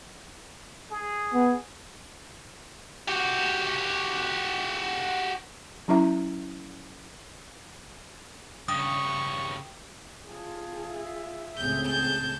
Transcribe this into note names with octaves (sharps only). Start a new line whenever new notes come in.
G#4
B3
F#4 G4
F#3 C#4 E4 E5 A#5
G2 C#3 G5 C#6 D#6
C#3 F4 G#4 G5 A5
E5
C#2 A2 C4 G#4 G6
A5 G6